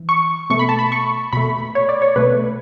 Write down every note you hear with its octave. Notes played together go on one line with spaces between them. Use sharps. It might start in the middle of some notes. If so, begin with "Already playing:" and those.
Already playing: E3
C#6
B2 A3 C#6
B5
A5
B5
C#6
B2 A3 B5
C#5
D5
C#5
B2 A3 B4